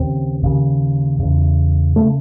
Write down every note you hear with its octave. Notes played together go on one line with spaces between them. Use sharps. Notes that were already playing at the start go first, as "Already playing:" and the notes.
Already playing: D#2 C#3 C4
D#2 C#3
E2 C#3
C#3 A3